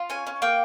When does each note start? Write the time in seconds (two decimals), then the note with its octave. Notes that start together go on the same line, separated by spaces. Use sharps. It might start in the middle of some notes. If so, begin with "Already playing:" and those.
Already playing: F4
0.10 C#4 G#5
0.27 C#4
0.42 A#3 G5